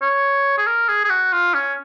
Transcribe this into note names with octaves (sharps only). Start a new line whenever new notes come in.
C#5
G#4
A#4
G#4
G#4
F#4
F4
C#4